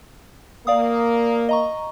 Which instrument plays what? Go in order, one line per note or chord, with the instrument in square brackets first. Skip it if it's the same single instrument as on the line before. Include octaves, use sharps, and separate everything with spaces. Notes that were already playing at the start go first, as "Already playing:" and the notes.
[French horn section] A#3 [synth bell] D5 F5 D#6
[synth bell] D#5 A#5 C#6